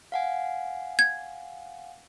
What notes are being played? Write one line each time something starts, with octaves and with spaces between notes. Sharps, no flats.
F5 F#5 G#5
G#6